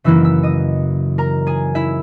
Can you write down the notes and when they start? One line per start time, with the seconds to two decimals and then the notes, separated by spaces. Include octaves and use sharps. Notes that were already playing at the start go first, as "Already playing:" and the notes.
0.04 F#2 C#3 E3 A#3 E4 E5 E6
0.24 E5 E6
0.43 D#5 D#6
1.18 A#4 A#5
1.47 G#4 G#5
1.75 E4 E5